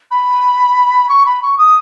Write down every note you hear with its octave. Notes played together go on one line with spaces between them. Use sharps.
B5
C#6
B5
C#6
D#6